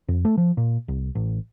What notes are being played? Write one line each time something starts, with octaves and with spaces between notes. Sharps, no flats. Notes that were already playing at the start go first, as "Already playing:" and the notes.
F2
A3
F3
A#2
C2
A1